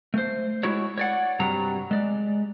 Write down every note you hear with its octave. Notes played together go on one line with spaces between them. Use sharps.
A3 C5
G#3 E4 F#4 C#5
C#5 D5 F#5
G2 C3 F#3 G3 A#5
G#3 D5